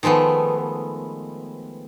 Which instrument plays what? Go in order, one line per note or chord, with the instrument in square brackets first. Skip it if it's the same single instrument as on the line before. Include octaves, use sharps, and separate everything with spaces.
[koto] D#3 F3 G#3 A3 B3